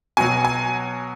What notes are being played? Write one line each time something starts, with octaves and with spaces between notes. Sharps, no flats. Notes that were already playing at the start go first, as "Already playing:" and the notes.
B2 F#3 G#5
G#5